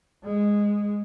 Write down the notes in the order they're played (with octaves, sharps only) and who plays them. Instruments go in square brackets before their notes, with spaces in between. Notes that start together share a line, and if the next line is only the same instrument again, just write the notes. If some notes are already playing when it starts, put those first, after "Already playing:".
[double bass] G#3